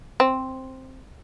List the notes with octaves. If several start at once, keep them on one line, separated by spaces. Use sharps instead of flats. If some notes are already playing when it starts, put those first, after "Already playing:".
C4